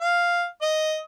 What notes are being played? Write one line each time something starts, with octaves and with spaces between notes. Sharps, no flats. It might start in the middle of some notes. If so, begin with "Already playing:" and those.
F5
D#5